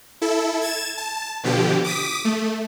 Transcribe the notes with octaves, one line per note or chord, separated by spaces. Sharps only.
E4 A4
G#6 A6 E7
A5
B2 D3 F3 G4
D6 D#6 B6
A3